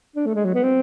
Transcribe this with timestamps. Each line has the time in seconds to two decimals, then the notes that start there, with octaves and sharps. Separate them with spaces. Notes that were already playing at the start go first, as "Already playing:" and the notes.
0.16 D4
0.26 A3
0.35 G#3
0.45 F#3
0.54 B3
0.63 C4